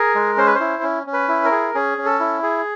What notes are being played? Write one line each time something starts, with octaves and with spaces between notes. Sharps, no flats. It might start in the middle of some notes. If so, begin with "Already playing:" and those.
Already playing: G#4 A#4
G#3
C#4 C5
B4
C5
E4
C#4
C#4
B4
E4
A#4
G#4
C#4 G#4
C#4
A4
E4
G#4